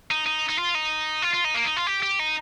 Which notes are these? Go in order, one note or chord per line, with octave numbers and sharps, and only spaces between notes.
D#4
D#4
D#4
F4
D#4
F4
F4
D#4
A#3
D#4
F4
G4
G4
D#4